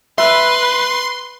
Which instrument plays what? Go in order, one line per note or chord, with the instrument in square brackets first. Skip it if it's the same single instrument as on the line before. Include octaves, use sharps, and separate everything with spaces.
[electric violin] B4 [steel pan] E5 [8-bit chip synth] C6